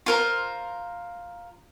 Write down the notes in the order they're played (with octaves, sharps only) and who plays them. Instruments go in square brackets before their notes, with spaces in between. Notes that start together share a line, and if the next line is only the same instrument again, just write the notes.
[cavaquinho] F4 A#4 C5